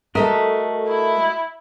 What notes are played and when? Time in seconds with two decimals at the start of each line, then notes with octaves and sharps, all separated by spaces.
0.15 A3 F#4 A4 A#4 D#5 E5
0.88 E4